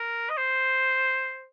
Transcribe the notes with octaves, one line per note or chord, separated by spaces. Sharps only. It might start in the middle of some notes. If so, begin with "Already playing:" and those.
Already playing: A#4
D#5
C5